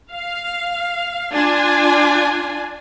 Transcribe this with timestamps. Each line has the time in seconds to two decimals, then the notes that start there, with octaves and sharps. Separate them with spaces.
0.11 F5
1.33 D4 F4 G#5